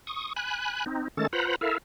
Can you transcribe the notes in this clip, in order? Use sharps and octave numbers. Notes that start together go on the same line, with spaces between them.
C#6 D#6
G#5 B5 F#6
C4 D#4
D#3 G#3 A3 C#4 A4 A6
F4 B4 C5 F#5 A#5 B5
E4 A4 A#4 E5 F5